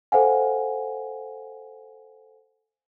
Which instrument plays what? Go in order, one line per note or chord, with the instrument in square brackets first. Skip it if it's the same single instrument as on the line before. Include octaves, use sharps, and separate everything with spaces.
[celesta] A4 C5 F5 F#5 G#5